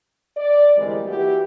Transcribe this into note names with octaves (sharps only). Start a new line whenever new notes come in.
D5
D2 E3 G3 G#3 C4 A#4
E3 A#3 E4 F#4 G4